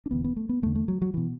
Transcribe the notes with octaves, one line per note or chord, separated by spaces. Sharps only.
D4
E1 E2 D3 B3
B3
A3
B3
E1 E2 D3 A3
A3
F#3
F#3
B2 E3